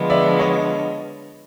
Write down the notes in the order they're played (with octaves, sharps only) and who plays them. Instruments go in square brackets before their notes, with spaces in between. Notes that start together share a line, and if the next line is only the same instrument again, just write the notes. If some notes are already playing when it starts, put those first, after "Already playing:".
Already playing: [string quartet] D3 F3 G#3 B3 D4
[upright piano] D5 E5
C#5 D#5